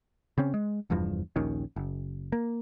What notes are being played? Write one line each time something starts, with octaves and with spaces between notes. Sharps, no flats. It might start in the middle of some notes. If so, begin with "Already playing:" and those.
C#3 C4 C#4
G#3
F1 E2 G2 F3
A#1 D#2 D#3 C#4
F#1
A#3